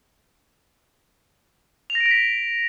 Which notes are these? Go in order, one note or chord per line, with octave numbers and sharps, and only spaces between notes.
F7
A#6
D7
A#6
B6